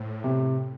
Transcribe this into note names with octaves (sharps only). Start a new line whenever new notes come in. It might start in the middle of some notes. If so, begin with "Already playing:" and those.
Already playing: A2 C5
C3